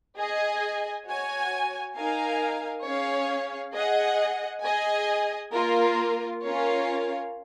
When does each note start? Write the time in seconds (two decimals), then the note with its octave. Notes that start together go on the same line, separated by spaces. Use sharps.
0.17 G#4 D#5 G#5
1.06 F#4 C#5 G#5
1.95 D#4 A#4 F5 G#5
2.85 C#4 G#4 C#5 F5
3.74 G#4 D#5 F#5
4.63 G#4 D#5 G#5
5.52 A#3 F4 A#4
6.42 C#4 F4 A#4 C#5 F5